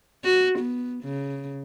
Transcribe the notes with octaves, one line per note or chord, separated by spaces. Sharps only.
F#4
B3
C#3